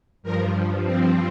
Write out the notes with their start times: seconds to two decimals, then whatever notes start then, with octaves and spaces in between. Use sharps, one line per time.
0.23 G2 F3 A#4
0.82 C4